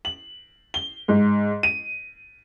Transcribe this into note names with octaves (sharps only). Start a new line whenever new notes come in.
F#7
G7
G#2
D#7